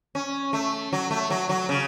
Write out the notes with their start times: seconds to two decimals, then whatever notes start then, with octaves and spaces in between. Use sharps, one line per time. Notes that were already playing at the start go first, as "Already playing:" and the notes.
0.15 C#4
0.53 A3
0.93 F#3
1.11 A3
1.30 F#3
1.49 F#3
1.69 C#3